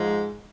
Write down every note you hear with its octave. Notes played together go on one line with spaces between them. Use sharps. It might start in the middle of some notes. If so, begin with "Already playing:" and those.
Already playing: G#2 F3 G#3